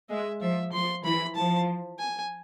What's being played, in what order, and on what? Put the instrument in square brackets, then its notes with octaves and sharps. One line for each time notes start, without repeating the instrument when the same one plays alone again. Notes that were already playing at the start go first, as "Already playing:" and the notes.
[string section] G#3 [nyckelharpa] E5
[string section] F3 [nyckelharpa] E5
[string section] F3 [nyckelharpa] C6
[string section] E3 [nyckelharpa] B5
[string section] F3 [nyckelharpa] A5
[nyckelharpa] G#5